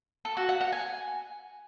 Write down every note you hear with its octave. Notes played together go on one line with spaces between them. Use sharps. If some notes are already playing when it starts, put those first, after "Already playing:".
A4
F#4
F#5
F#5
G#5